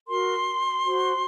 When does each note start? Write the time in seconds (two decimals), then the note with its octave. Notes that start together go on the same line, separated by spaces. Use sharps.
0.07 F#4 A#4 C6
0.85 F#4 C5